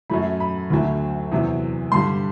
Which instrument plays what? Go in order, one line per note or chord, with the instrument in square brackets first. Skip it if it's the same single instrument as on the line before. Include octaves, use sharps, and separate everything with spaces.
[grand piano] F#2 F#3 A3 B5
B5
D2 D3 F#3 A3
E2 C3 F#3
G2 D3 G3 C6